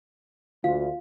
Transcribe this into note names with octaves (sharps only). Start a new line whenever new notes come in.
D2 F4 F5